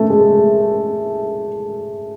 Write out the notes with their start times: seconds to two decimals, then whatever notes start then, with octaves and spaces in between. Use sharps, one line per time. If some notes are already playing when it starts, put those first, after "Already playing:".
Already playing: A3
0.10 G#3